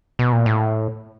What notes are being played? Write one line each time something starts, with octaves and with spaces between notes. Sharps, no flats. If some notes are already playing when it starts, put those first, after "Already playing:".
B2
A#2
A2